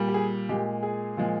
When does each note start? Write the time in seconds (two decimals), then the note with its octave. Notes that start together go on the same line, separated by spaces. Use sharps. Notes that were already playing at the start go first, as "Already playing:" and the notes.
Already playing: A#2 G3
0.08 G4
0.14 G#4
0.49 A#2 G#3 G4
0.83 G#4
1.17 A#2 F3 G#3